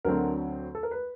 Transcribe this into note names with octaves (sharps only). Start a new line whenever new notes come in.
D2 D3 F#3 A3 C4 A#4
A4
A#4
B4